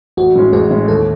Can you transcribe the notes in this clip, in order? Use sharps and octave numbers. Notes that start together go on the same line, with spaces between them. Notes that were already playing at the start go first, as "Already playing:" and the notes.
A1 F#4
A2 G#3 C#4
A1 G#4
A2 G#3 C#4
D#2 A4